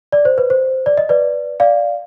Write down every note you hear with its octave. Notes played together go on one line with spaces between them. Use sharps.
D5
C5
B4
C5
D5
D#5
B4 D5
D5 F5